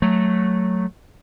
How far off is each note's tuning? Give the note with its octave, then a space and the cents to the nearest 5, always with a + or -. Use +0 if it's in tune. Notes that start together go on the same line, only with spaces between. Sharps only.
F#3 +0 A3 +0